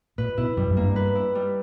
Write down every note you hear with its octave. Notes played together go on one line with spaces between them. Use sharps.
A#2 B4
B2 E4
F#2 G3
F#2
A#3
G2
B4
E4
G3